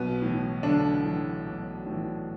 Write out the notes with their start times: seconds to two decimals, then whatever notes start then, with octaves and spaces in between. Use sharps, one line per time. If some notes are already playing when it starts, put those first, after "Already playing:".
Already playing: B1 B2 B3
0.22 A2 E3
0.63 B1 D3 D4
1.04 A2 E3
1.46 B1
1.86 A2
1.92 E3